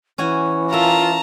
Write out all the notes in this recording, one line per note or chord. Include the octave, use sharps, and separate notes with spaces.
E3 C#4 F#4 G#5
F4 A#4 E5 A5 A#5